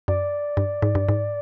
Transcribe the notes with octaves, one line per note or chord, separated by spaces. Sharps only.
F#2 D5
G2
G#2
G2
G#2